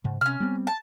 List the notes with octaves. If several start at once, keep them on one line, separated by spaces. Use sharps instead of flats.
G#2 C#3
C3 C#4 F6
G3 B3 C4
A5